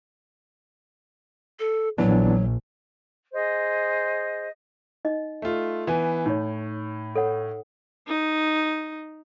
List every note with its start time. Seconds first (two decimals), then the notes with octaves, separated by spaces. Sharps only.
1.60 A4
1.98 A#1 E3 F#3 B3 D4
3.32 G#4 C5 D#5
5.05 D#4 D#5
5.42 A3 F4
5.87 E3 B3 G#5
6.26 A2 D#4 C#5
7.15 A4 C#5 F#5
8.08 D#4